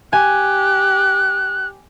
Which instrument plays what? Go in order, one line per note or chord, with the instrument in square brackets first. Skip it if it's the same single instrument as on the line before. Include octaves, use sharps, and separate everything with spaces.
[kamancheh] G4 [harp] G#5 [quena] F#6